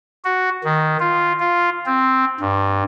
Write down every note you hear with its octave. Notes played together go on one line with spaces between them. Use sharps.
F#4
D#3
F4
F4
C4
G2